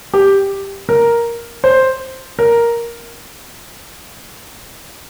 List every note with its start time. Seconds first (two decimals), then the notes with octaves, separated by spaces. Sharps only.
0.14 G4
0.89 A#4
1.64 C5
2.39 A#4